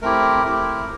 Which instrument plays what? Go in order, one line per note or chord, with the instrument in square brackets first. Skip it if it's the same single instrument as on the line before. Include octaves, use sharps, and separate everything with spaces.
[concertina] A3 C4 E4 G4 A#4
A3 C4 E4 G4